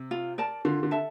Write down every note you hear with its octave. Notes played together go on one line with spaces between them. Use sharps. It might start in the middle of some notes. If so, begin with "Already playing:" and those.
Already playing: C3
F4
A#4 D5 A5
D3 F4
D3
A4 E5 A5